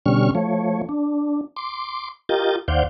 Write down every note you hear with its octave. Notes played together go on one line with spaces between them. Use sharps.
B2 D3 G3 C#4 C#6 F6
F3 A3 C#5
D4
C6 D6
F4 G4 A#4 D#5 G6 A6
D#2 C5 D5 F5 F#5 G6